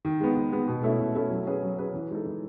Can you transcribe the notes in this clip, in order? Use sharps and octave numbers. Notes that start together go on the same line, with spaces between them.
D#3
G#3 B3
D#3
G#3 B3
B2
A3 C#4 E4 A4
B2
A3 C#4 E4 A4
F#3
C#4 G#4 B4
F#3
C#4 G#4 B4
E3
G#3 D#4 A4
E3